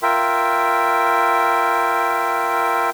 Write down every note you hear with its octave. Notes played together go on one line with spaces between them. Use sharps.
F4 A#4 E5 G5